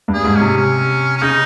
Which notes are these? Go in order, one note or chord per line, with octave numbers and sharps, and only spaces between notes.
G2
G#4
G#2
C#4
C3
C#4
C#4
C#3 D#4